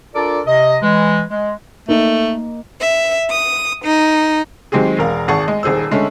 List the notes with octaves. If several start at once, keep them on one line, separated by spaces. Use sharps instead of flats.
D4 F4 A4 A#4 D5
C3 D#5
E3 G#3
G#3
A3 A#3 D#4
E5
D#6
D#4
D#3 F#3 G#3 C4 G4 G#4
E1 A#4 F5
G#1 G#4 F#5 A5 C#6
G#3 D#5
D#1 D#2 G#4 C5 E6
D3 G#3 A3 C#4